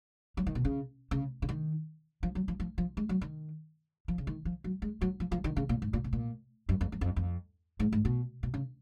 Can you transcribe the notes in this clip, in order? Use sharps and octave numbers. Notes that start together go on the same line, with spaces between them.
F#3
D#3
B2
C#3
C#3
C#3
D#3
F3
F#3
F3
F3
F3
G#3
F#3
D#3
F3
C#3
D#3
F3
F#3
G#3
F#3
F3
F3
D#3
C#3
A#2
G#2
A#2
B2
A#2
F#2
F2
F#2
F2
F2
G#2
G#2
B2
B2
C#3